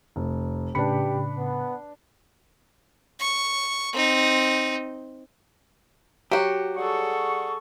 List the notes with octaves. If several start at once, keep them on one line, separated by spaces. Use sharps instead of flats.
F1
A2 C#3 D4 G4 B4 B5 C#7
B3
C#6
C4 D#4
F#3 F#4 G4
G3 G#4 A4 F#5 C#6